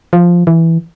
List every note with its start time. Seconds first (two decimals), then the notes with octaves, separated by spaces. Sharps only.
0.13 F3
0.47 E3